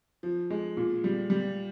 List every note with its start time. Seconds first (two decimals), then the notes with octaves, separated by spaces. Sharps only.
0.23 F3
0.50 G#3
0.77 A#2
1.04 G3
1.30 G3